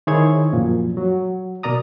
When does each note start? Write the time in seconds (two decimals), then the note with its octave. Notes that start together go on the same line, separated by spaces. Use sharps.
0.07 D#3 E4 G#4 C5 C#5 G#6
0.53 F#2 A#2 F3
0.97 F#3
1.63 B2 A#4 D5 A#5 D#6